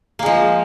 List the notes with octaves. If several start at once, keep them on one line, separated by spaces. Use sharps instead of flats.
F3 G#3 A#3